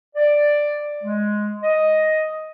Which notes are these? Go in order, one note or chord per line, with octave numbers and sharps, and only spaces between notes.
D5
G#3
D#5